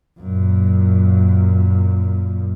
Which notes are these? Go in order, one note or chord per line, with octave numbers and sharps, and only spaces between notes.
F#2 A#2